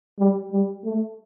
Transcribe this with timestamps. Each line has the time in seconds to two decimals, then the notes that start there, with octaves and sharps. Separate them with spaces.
0.19 G3
0.52 G3
0.85 A3